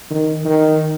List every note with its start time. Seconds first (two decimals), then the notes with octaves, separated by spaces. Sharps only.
0.11 D#3
0.45 D#3